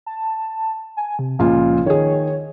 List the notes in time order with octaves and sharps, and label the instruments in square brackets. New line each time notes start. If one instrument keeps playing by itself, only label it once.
[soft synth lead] A5
G#5
C3
[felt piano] C#2 A#2 F4 [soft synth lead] F3
[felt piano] D#3 G#4 [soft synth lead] C#5